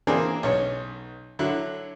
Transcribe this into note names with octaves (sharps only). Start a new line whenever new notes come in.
E3 A#3 C4 D4 G#4 A#4
B1 C#4 C#5
D3 F#3 E4